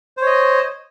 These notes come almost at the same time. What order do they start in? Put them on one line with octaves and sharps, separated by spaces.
C5 C#5 D#5